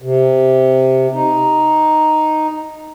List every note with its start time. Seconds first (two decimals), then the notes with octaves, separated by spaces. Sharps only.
0.02 C3
1.15 D#4